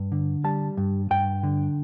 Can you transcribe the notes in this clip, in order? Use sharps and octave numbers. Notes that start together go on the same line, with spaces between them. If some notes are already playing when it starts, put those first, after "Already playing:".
Already playing: G2
D3
G3 A5
G2
G2 G5
D3